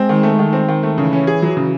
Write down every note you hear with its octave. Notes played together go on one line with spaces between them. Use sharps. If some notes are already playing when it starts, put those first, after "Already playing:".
Already playing: G#3 C4
D#3
A3
D#3
C4
D#3
A3
C#3 E3
C#4
G#4
F#3
C#3